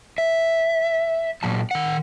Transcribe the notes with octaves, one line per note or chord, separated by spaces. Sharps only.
E5
A#2 F#3 A5
D#3 F#5